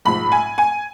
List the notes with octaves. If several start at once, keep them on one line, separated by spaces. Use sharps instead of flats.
A#1 G#2 F3 B5
G#5
G#5